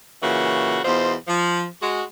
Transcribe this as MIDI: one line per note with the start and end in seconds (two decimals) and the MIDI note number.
0.23 0.79 46
0.23 0.79 49
0.23 0.79 52
0.23 0.79 66
0.85 1.14 40
0.85 1.14 47
0.85 1.14 65
0.85 1.14 72
1.27 1.65 53
1.81 2.02 56
1.81 2.02 66